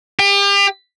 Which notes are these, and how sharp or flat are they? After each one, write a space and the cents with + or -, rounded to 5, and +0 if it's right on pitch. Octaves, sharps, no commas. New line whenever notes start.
G4 +35